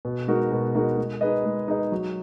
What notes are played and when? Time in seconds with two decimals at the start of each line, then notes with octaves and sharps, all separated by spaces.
0.05 B2
0.28 G#3 D#4 F#4 A#4
0.52 B2
0.75 G#3 D#4 F#4 A#4
0.98 G#3
1.21 D#4 G#4 B4 D#5
1.45 G#3
1.68 D#4 G#4 B4 D#5
1.92 F#3